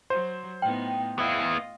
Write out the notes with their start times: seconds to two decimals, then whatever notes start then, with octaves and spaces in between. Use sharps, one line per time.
0.10 F#3 C5
0.62 A2 B3 D#4 G5
1.19 B3 E4 F4 D#5